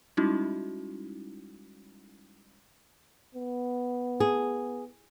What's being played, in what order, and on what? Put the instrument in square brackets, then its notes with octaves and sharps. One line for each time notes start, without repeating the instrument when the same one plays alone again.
[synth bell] G3 G#3 C#4 D#4 E4 F#4
[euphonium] B3
[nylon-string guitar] G#4